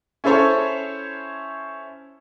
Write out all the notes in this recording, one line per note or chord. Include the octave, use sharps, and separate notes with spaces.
C#4 E4 A4 C5 C#5